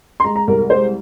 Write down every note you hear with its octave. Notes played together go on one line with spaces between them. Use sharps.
C6
G#3 A#5
A#5
C2 A#4
A#4
G#3 C5